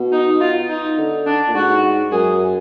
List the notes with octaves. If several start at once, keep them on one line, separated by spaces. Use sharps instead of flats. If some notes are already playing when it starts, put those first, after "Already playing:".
Already playing: B2
D#4
F4
D#4
D3
D4
A#2
G#2 F#4
F#2 G#4